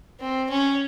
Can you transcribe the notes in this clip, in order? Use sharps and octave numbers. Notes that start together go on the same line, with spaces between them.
C4
C#4